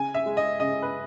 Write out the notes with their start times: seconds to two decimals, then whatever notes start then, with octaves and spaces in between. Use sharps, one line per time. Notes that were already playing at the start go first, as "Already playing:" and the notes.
Already playing: C#3 G#5
0.14 E5
0.26 G#3
0.37 D#5
0.60 C#3 D#5
0.82 B4